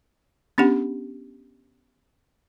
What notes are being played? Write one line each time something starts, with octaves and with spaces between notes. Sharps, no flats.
B3 C#4 D4 G4 F#5